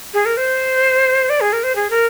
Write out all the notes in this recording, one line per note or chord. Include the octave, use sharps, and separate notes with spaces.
G#4
A#4
C5
D5
G#4
A#4
C5
G#4
A#4